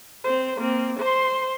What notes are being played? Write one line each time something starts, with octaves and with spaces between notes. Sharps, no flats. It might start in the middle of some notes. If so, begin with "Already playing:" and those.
C4 C5
A#3 C4
C5 C6